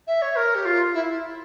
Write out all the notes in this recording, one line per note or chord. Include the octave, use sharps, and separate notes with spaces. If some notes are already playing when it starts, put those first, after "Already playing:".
E5
C#5
A#4
G4
F4
E4